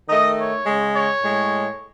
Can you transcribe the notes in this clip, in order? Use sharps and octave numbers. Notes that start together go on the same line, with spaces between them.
D#3 A3 D#5
C#5
C#3 G#3
C#5
A2 G#3